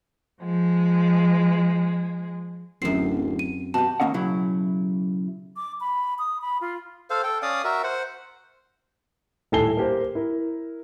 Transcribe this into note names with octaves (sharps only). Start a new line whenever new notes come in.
F3 G#3
D1 F#2 C4 C7
D#7
B2 F#4 G4 A5
D#2 D#3 A#3 C#4 D#5 F#5
B1 C#3 F#3 E4
D6
B5
D#6
B5
F4
A4 C5 F5
A4 G5
C#4 D5 F5 D#6
F#4 A#4 E5
C5 F#5
D#1 A2 A4 G#5 C7 G7
A#3 G4 A#4 C5
E4 A#4